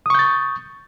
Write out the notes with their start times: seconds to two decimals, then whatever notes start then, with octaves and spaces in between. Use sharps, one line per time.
0.06 D#6
0.10 C#6
0.15 G6
0.19 A6